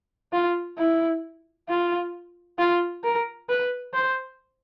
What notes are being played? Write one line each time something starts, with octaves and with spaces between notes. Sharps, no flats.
F4
E4
F4
F4
A#4
B4
C5